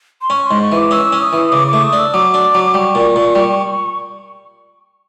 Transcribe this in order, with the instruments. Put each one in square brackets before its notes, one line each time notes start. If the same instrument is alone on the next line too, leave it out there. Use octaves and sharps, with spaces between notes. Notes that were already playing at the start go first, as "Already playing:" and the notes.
[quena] C6
[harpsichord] C#4 [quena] C#6
[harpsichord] G#2 [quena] C6
[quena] C#6
[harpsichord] E3 [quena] D6
[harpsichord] C#4 [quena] E6
[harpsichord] C#4
[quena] D#6
[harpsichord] E3
[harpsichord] C#3 [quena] D6
[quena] D6
[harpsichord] A3
[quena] D#6
[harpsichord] D4
[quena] E6
[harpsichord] F#3 [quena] D6
[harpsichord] D4
F#3
[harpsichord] G3 [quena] D6
[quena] C#6
[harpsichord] A#2
A#2
G3